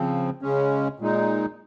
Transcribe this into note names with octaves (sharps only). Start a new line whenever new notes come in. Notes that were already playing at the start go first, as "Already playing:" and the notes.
Already playing: C#3 F3 C4
C#3 G#3 C#4
A#2 G#3 D#4